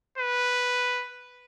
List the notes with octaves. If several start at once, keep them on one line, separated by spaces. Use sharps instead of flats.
B4